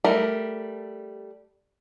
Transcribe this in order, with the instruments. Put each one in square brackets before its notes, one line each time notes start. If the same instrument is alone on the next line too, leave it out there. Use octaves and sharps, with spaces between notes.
[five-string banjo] G3 A3 A#4